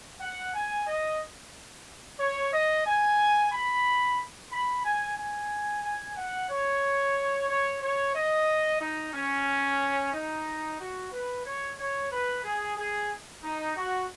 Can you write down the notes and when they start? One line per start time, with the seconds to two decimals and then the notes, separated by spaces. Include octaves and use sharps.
0.21 F#5
0.54 G#5
0.87 D#5
2.19 C#5
2.53 D#5
2.86 G#5
3.52 B5
4.51 B5
4.85 G#5
5.18 G#5
5.83 G#5
6.17 F#5
6.50 C#5
7.49 C#5
7.82 C#5
8.15 D#5
8.81 D#4
9.13 C#4
10.13 D#4
10.80 F#4
11.12 B4
11.46 C#5
11.79 C#5
12.12 B4
12.44 G#4
12.77 G#4
13.43 D#4
13.77 F#4